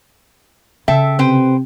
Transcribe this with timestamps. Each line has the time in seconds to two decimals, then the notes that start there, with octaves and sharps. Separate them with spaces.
0.88 C#3 A4 E5 G5
1.19 C3 B4 C5 G5